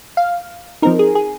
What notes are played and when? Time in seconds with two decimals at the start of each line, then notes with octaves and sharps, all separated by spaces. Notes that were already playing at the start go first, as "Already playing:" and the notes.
0.17 F5
0.82 F3 C4 D#4 A#4
0.99 G#4
1.15 G#4